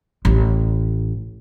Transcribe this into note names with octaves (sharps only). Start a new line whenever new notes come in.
A1